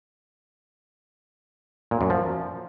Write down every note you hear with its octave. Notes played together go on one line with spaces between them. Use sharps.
A#2
F#2
F3